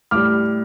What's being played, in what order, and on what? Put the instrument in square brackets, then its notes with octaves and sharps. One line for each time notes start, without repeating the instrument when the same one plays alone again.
[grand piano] A2 G3 D6 F6